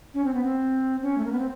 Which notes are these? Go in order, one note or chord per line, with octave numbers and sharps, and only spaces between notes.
C#4
C4
B3
C4
C#4
A3
A#3
B3
C4